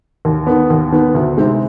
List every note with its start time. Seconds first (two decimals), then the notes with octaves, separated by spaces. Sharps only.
0.25 D#2
0.47 D#3 B3
0.70 D#2
0.92 D#3 B3
1.15 D2
1.37 C3 D#3 G#3 C4